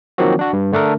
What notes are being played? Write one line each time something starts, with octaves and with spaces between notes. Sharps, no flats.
D#3 F3 F#3 A#3 C4 F#4
D4 F#4
G2
D3 A3 D4 A4 A#4